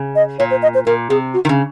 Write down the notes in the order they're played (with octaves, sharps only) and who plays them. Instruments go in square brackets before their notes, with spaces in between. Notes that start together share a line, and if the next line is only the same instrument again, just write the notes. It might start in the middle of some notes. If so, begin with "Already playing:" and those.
Already playing: [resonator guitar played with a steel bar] C#3
[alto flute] D#5
[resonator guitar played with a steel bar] A#2 [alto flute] C#5
[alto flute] C5
D#5
C5
[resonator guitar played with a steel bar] A#2 [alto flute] A#4
[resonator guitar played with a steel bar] C3 [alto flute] G#4
[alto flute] F#4
[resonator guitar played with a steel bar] D#3
C#3